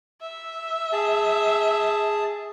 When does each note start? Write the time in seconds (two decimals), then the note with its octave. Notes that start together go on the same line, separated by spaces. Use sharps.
0.21 E5
0.93 G#4 A5